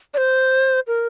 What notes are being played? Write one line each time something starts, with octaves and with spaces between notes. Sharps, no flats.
D5
C5
A#4